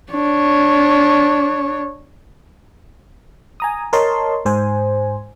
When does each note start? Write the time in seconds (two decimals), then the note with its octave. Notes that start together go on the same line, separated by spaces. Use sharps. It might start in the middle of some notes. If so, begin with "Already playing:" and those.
0.12 D4 C#5
3.60 G#5 A#5 D#6
3.93 A#4 C#5 D#5 A5 C6
4.45 G#2 C5 G#5